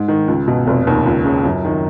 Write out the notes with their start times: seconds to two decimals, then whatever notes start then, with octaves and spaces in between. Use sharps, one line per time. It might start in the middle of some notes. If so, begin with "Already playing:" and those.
Already playing: G#2
0.08 D#3
0.28 C#2
0.48 B2
0.67 F1
0.87 D#2
1.06 C#2
1.25 C#3
1.45 F#2
1.65 D#3